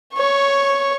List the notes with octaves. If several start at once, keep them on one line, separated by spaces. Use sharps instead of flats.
C#5 C#6